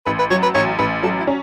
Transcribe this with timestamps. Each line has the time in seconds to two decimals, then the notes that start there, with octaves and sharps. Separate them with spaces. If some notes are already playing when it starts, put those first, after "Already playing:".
0.06 A1 B4
0.19 B4
0.31 F#3 C#5
0.43 B4
0.55 A1 C#5
0.79 A1 B4
1.03 F#3 A4
1.20 E4
1.27 C#4